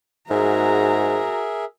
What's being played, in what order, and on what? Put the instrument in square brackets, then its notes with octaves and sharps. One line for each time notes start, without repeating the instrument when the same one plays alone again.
[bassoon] G#2 [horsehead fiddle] F#4 A#5 [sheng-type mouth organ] G#4 A#4 E5